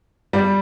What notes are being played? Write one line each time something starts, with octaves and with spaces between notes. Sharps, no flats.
G3